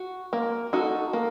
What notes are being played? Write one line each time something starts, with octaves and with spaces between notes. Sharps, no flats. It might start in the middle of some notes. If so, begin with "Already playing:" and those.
Already playing: F#4
A#3
D#4 F#4 A4
A#3